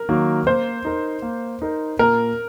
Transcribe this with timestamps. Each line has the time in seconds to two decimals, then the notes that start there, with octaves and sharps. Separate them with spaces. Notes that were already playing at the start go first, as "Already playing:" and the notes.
Already playing: A#4
0.09 D#3 F#3 A#3
0.46 A#3 C5
0.85 D#4 A#4
1.22 A#3
1.62 D#4 A#4
1.99 A#2 A#4